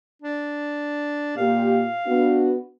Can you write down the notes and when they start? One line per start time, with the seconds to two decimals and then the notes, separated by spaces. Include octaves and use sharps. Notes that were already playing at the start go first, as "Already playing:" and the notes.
0.22 D4
1.37 A#2 A#3 G4 F5
2.06 B3 D4 F#4